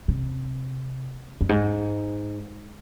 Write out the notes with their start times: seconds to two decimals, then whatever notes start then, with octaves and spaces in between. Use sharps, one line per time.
0.08 C3
1.41 F2
1.49 G#2